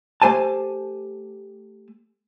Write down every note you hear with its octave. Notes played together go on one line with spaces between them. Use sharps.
A3 G4 C5 G#5 A5